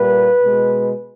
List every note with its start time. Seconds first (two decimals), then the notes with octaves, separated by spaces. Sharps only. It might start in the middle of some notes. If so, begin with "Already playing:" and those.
Already playing: A#2 G3 A#3 B4
0.42 B2 G#3